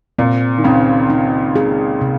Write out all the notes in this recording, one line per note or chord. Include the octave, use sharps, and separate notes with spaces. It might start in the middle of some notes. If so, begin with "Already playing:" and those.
A#2 C4
D#3
C#2 C#3 C4
D#4
G#4
C3